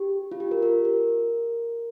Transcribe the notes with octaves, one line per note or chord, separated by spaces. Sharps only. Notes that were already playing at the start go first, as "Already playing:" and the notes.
Already playing: G4
F4
G4
A#4
A#4
A#4